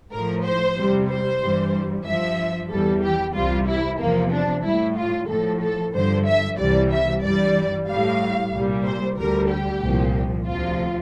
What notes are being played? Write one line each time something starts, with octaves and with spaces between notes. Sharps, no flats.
A2 F3 A#4
C5
E2 C3 G3
C5
G2 E3 G3
G2 F3 E5
E2 E3 G3 A4
G4
C2 C3 G3 F4
E4
E2 C3 F3 A#3
D4
A2 G3 E4
F4
A2 F3 A4
A4
G2 D3 F3 C5
E5
C2 C3 E3 G3 D5
E5
G2 E3 G3 D5
A2 G3 F5
C2 A#2 G3
C5
D2 D3 G3 A#4
G4
C2 A#2 F3
D2 C3 F3 F4